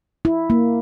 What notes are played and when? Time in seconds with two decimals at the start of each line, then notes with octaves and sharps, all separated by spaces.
0.25 E4
0.50 A#3